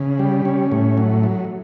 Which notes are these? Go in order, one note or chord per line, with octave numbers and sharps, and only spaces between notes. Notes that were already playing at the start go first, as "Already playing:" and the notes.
Already playing: C#3
G3
C#4
A2
F#3
F#3